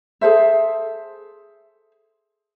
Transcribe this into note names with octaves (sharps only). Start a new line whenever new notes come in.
G#4 A4 C5 E5